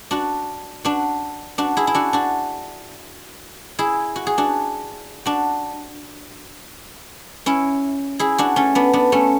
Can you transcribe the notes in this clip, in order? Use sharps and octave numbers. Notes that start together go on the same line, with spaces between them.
D4 F#4
D4 F#4
D4 F#4
E4 G#4
E4
D4 F#4
D4 F#4
E4 G#4
F#4
G#4
D4 F#4
D4 F#4
C#4 E4
E4 G#4
D4 F#4
A3 C#4
B3 D4
B3 D4
A3 C#4